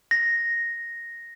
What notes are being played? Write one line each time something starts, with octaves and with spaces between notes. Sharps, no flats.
A#6